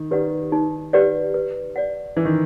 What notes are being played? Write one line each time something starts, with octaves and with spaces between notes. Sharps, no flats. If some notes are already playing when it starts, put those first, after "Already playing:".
Already playing: D#3
D#3 G4 B4 D5 F#5
D#4
G4 B4 D5 F#5
B4
D5 F#5
E3 B4
D#3